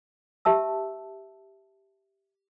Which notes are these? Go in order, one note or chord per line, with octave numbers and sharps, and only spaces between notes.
G4 E5 A5 E6